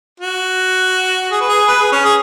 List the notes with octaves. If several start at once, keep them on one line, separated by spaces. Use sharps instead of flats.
F#4
G#4
B4
G#4
B4
G#4
C#4
G#4